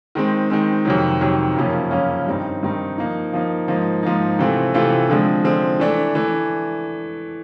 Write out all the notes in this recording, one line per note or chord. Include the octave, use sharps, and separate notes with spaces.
D#3 G#3 C4
D#3 G#3 C4
F2 C3 D#3 F#3
F2 C3 D#3 F#3
F#2 C#3 F3 A#3 C#4
F#2 C#3 F3 A#3 C#4
G2 D#3 G3 C4 D#4
G2 D#3 G3 C4 D#4
F3 A#3 D#4
F3 A#3 D#4
G#2 F3 A#3 D#4
G#2 F3 A#3 D#4
C3 E3 A3 C4 F4
C3 E3 A3 C4 F4
D3 F3 G#3 C4
D3 F3 G#3 C4
E3 A3 D4
E3 A3 D4